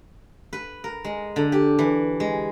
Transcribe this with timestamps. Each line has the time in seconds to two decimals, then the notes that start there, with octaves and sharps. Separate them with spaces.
0.53 B4
0.84 A#4
1.04 G#3
1.36 D3
1.52 G4
1.79 E3
2.20 G#3